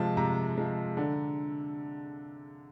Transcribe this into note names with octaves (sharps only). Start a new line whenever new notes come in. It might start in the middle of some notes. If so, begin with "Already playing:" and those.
Already playing: C3 F3 G#3 A5
C3 A#5
F3 G#3
D3